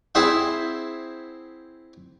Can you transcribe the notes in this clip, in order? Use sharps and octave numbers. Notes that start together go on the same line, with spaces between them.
C4 E4 G#4 C5 E5 F#5